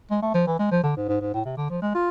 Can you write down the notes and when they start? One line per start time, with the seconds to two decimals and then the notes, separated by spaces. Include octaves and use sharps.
0.11 G#3
0.22 A3
0.34 F3
0.47 E3
0.59 G#3
0.71 F3
0.83 D3
0.97 G#2
1.09 G#2
1.21 G#2
1.34 A2
1.45 C3
1.57 D3
1.70 F3
1.82 G#3
1.94 F4